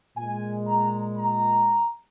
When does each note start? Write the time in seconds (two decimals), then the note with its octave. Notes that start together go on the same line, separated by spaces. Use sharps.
0.17 A#2 G#3 G#5
0.67 A#5
1.18 A#5